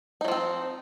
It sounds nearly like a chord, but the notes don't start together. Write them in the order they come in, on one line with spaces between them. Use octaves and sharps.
D#4 F#3 F3 C4